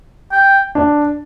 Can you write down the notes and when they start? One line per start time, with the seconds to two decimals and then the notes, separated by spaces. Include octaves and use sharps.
0.32 G5
0.75 D4